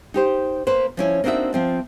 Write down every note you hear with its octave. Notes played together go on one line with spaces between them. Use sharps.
D#4 G4 C5
A#3 B4 C5
F3 C#4 E4
A#3 C4 D4 D#4 F#4 E5
F3 C4 F4